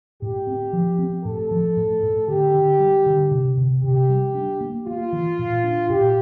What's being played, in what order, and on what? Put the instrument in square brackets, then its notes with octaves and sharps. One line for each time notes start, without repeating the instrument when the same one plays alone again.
[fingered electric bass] A2 [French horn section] G4
[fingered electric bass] C4
F3
C4
[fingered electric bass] A2 [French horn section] A4
[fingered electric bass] F3
A2
A2
[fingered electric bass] D3 [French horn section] G4
[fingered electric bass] D3
G3
D3
C3
C3
[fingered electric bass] C3 [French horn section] G4
[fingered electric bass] G3
D4
A#3
[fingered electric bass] A#3 [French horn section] F4
[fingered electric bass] E3
A#2
D4
[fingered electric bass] A#2 [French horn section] G4